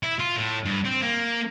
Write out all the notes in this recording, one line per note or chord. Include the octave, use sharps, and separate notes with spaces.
E4
F4
A2
G2
C4
A#3